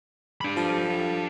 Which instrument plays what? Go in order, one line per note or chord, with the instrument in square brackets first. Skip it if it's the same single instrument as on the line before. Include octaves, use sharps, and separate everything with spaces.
[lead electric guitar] D4 B5
[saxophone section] F3 A4